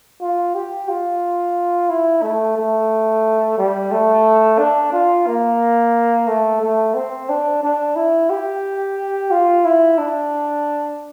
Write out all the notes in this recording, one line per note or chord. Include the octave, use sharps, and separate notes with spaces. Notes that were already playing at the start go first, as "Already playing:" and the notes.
F4
G4
F4
E4
A3
A3
G3
A3
D4
F4
A#3
A3
A3
C4
D4
D4
E4
G4
F4
E4
D4